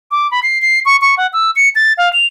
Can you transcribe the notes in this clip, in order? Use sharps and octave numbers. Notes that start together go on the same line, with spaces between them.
D6
B5
C7
C7
C#6
C#6
F#5
E6
C#7
A6
F5
F7